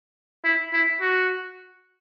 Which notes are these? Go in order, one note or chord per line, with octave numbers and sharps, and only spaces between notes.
E4
E4
F#4